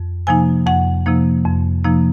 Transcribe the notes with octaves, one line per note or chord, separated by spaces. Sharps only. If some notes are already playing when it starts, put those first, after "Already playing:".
Already playing: F2
C3 F3 A#3 D#4 G#5
F2 F#5
C3 F3 A#3 D#4
F2
C3 F3 A#3 D#4